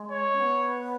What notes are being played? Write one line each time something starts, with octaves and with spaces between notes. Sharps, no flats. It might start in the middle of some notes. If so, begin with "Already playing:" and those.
Already playing: G#3
C#5
C#4
B3